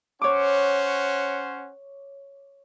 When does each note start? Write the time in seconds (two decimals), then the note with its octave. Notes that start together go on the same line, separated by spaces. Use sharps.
0.22 C#4 C5 C#5 F#5 D6